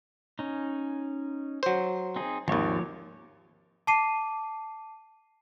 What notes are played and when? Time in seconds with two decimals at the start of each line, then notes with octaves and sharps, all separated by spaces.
0.39 C#4 D#4
1.63 F#3 C5
2.16 C4 D#4 G#4
2.48 G#1 D#2 F3 C#5 D5
3.87 A5 D6 C7 D#7